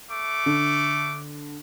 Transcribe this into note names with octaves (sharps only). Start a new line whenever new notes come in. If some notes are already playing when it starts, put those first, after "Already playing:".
A3 D6
D3